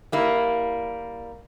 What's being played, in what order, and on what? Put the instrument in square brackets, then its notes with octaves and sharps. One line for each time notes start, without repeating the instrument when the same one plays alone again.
[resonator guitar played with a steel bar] G3 A#3 E4